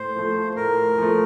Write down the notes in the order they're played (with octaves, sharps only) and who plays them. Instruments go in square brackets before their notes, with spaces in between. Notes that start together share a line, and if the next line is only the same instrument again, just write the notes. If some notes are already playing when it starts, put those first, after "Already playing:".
Already playing: [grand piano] A2 [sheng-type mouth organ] C5
[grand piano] F3 A3
[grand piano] A2 [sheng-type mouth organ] A#4
[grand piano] F3 A3